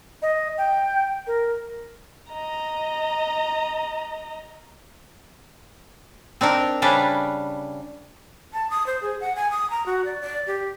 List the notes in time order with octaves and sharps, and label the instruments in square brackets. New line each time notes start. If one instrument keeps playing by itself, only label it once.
[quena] D#5
G5
A#4
[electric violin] D#5 A#5
[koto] C4 D4 D#4 A#4
C#3 G3 C#4 D4 B4 D5
[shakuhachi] A5
D#6
C5
G#4
F#5
G#5
D#6
A#5
F#4
D5
D5
G4